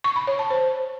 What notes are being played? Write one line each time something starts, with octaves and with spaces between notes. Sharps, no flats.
C#6
B5
C#5
A5
C5